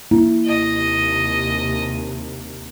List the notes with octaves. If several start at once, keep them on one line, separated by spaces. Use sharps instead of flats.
A#3 E4
D#2 C3 D#5